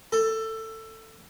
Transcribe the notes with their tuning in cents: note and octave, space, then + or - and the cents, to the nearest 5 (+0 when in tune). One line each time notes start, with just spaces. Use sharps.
A4 +15